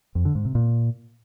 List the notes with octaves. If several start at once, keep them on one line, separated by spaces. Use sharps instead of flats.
F2
D3
G#2
C3
A#2